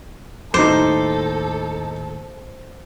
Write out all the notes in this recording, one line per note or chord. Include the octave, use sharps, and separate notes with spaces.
D#2 A2 D#4 A4 C5 D6